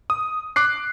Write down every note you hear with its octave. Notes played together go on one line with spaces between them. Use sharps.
D#6
D6 F#6 C7